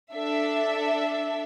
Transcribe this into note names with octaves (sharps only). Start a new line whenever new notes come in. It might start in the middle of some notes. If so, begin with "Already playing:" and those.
D4 A4 E5